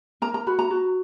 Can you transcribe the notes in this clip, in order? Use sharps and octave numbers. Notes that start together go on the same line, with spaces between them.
A#4 A#5
A#5
F#4 B5
A#5
F#4